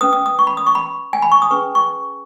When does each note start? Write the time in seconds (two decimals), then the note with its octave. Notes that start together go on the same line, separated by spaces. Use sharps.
0.01 C#4 B4 D#6
0.13 D#6
0.26 D#6
0.39 C#6
0.47 B5
0.57 D#6
0.67 C#6
0.75 B5
1.13 G#5
1.22 B5
1.32 C#6
1.42 D#6
1.51 C#4 G#4 B4 C#6
1.75 C#6